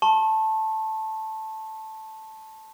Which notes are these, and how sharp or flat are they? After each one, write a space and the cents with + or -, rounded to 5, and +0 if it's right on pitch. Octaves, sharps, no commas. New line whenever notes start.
A5 +0 C#6 -45